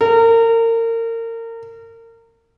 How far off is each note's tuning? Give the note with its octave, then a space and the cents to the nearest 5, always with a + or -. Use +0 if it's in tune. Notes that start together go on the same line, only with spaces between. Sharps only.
A#4 -30